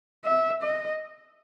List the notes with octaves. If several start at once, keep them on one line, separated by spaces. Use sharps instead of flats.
E5
D#5